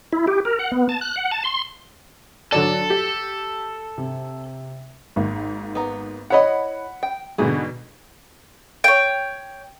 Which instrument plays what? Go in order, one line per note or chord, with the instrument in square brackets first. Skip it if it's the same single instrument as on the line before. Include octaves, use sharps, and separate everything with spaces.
[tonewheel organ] E4
G4
A#4
F#5
B3
A5
F#6
F#5
A5
C6
[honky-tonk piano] D3 F#3 D5 [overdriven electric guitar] A4
[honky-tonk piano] G4
C3
G#1 G#2 A#3
[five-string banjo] B3 A#5
[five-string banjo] E4 C#5 D#5 [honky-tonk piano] F#5 B5
[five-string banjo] G5
[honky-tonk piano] G#2 B2 D3 [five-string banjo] E3 G3 G#4
[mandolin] C#5 G5